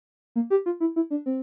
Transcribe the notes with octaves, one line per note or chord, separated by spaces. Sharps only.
A#3
G4
F4
E4
E4
D4
C4